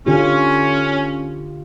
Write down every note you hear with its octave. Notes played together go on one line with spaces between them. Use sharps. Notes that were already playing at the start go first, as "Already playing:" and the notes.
D3 C#4 F4 G4